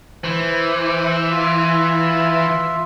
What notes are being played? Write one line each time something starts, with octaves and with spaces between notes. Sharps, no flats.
E3 C5
F4 E5